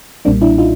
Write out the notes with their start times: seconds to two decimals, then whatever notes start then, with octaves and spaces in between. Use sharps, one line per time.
0.25 B1 A#2 G3 A#3 C4 D4
0.42 D4 E4
0.58 D#4 F4